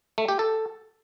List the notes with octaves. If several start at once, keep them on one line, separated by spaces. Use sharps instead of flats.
A3
G4
A4